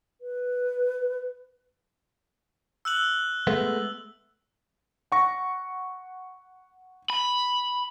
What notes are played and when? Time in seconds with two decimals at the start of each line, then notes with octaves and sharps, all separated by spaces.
0.21 B4
2.85 E6 F#6 F#7
3.47 G#3 A3 B3
5.12 F#5 C#6 A#6
7.10 B5